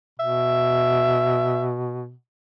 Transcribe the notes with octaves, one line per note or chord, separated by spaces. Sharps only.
B2 E5